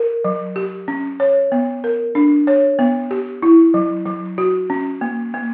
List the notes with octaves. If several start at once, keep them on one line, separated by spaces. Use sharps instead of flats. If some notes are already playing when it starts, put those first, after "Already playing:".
Already playing: A#4
F#3
G4
C#4
C#5
B3
A#4
D4
C#5
B3
G4
E4
F#3
F#3
F#4
C#4
A#3
A#3